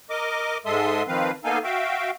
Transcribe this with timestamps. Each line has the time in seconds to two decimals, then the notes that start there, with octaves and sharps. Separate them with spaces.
0.10 A#4 D#5 D6
0.66 G#2 G#3 A4 E5 C6 D#6
1.08 D#3 F3 C4 B4 F5
1.44 A#3 B3 D#4 A4 F5 G#5
1.64 F#4 E5 F5 G5